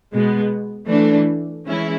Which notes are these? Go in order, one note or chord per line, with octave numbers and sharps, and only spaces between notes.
B2 G#3 B3
E3 A3 D4
E3 G#3 C#4 E4